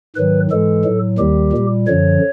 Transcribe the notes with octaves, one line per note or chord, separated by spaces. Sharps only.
G#2 D#3 F#3 B4
G#2 E3 G#3 A4
A2 F#3
D#2 D#3 G3 G4
A#2 G3
F#2 D3 F3 C#5